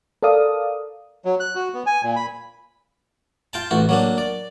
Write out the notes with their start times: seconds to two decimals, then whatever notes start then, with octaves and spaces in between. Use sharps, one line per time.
0.23 A4 A#4 D5 F5 D#6
1.25 F#3
1.40 F#6
1.55 F#4
1.74 B3
1.86 G#5
2.03 A#2
2.16 B5
3.53 F4 G5 A5
3.71 A1 F#4
3.89 F#3 A#3 D4
4.18 D5